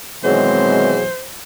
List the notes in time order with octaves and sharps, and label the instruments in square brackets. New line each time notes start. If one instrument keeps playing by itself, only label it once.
[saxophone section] B2 E3 F#3 [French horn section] D#3 G#3 C4 [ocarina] G#4 [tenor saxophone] C5